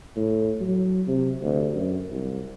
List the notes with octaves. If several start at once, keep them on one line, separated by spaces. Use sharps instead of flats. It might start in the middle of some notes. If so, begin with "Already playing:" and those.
A2
F#3
C3
D2
F#2
C2